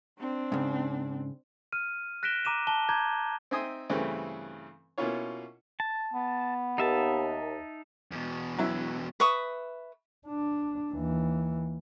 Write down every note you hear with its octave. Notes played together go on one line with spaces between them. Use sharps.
C4 D4
G#2 C#3
F6 D#7
F#6 A#6 B6 D7 E7 G7
A#5 D6 D#7 E7
A5 G7
A#5 D6 G6 G#6
C4 D#4 E5 G#5 C6 D#6
G2 C#3 E3 A3 C4
B2 A#3 C#4 E4 F4 C#5
A5
B3
D#2 D#4 E5 A5
E2 B2
F#3 E4
B4 E5 C#6 D#6
D4
D#2 E3